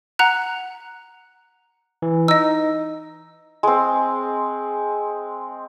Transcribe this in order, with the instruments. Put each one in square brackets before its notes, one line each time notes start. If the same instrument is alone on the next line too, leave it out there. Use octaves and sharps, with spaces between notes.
[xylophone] F#5 A#5 F#6
[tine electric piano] E3
[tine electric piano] D#4 [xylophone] D#5 E6
[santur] G#3 C4